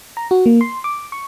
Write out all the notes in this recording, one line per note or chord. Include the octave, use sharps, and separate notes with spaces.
A#5
F#4
A#3
C6
D6
C#6